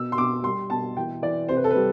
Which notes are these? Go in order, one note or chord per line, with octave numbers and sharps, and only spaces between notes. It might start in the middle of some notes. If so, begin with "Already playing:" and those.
Already playing: B2 E6
C6
B2 D6
G3 C6
B2 A5
E3 G5
E3 D5
C3 C5
B4
A4
G3 B4